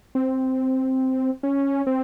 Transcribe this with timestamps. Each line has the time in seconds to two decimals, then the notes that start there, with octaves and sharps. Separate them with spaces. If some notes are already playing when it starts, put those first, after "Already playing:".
0.15 C4
1.43 C#4
1.87 C4